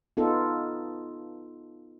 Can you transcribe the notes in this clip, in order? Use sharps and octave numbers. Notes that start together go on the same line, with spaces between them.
B3 D#4 F4 A4